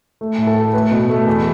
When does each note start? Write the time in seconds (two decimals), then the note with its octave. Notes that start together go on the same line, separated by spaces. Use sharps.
0.21 A3
0.38 A2
0.47 A4
0.56 A3
0.73 A3 B4
0.91 B2
1.09 A3
1.27 E2